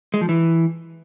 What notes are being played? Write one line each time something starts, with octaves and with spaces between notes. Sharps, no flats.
G#3
F3
E3